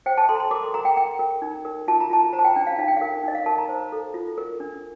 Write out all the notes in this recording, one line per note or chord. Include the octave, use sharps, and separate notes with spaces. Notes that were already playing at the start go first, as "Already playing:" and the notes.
C5 G5
A5
A4 C6
A#5
C6
A#4 D6
C6
A#4 A#5
G5
A#4 G5
A#4
D#4
A#4
F4 A5
A#5
F4 A5
C5 A#5
A5
G5
D4 G5
F5
D#4 F5
G5
A#4 F5
D#4 D#5
F5
A#4 A5
A#5
C5
A4
F4
A#4
D4